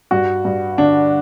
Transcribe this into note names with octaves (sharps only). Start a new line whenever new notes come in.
G2 F#4
G2
D3 D4